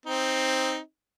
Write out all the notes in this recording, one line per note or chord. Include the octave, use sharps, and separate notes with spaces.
C4 D#4